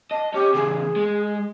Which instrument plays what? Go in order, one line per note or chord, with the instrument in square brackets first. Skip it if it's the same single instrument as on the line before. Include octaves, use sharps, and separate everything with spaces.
[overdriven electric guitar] D#5 [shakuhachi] A5
[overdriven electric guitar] C#4 [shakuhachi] G4
[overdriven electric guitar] E2 C#3 [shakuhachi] G#4
[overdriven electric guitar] G#3